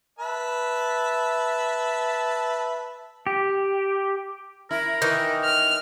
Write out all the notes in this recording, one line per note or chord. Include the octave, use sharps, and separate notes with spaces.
B4 E5 A5
G4
E4 A#4
D#3 E3
F6